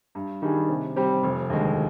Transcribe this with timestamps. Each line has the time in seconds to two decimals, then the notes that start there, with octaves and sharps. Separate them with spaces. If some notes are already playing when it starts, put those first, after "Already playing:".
0.15 G2
0.42 D#3 G3 D4 G#4
0.69 C3
0.96 G3 C4 G4
1.23 F1
1.50 D#2 D3 G#3